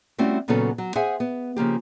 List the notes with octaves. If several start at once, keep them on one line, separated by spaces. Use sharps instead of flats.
G3 A3 C4 C#4 E4 F#4
A#2 C#3 F#3 B3 C#4 A4
F#3
G#4 C5 E5 F#5 G#5
B3
C#3 F3 A#3 G4